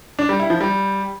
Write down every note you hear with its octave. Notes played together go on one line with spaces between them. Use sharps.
D4
G3
E4
F3
G3